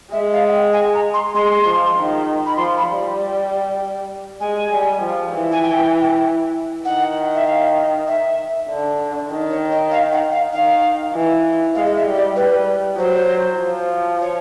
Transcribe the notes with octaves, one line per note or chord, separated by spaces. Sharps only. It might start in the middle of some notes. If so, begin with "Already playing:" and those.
G#3 E5
F5
F#5
G5
G#5
A#5
C6
G#3 C6
F3
D#3
B5
F3 C6
B5
G3
G#3 G#5
G3
F3
E3
G#5
G5
D#3 F#5
E5
F5
E5
D3
D#3
C#5
D#5
F5
F#5
F5
D#3 F5
E3
G#3 F5
D#5
E5
G3
D5
G3 B4
F#3 C5
F3
C#5